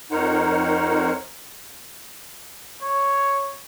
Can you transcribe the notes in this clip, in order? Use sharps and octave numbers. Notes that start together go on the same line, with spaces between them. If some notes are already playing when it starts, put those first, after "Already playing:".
F2 D#4 A#4 C5 C#5 F#5
C#5